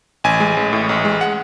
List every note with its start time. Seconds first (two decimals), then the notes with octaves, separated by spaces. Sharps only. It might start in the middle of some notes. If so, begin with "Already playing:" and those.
0.24 A1 G#5
0.40 G#3
0.57 A1
0.73 A2
0.89 A1
1.05 G#3
1.21 F#5